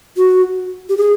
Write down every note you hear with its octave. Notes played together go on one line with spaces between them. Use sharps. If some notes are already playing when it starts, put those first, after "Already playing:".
F#4
G4
G#4